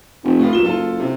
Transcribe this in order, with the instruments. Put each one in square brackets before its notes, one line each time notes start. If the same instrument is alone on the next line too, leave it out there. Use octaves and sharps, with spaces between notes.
[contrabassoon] F1
[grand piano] A2 B3 F4
[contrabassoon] A#2 [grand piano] F#3 E7 G7
[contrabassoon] F#1 [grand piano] F4 A4
[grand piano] C3